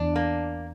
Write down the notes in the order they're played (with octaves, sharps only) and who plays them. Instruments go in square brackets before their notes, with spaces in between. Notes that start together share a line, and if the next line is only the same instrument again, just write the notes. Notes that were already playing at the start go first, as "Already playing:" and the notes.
Already playing: [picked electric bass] E2 [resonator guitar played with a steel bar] D4
[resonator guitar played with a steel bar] A#3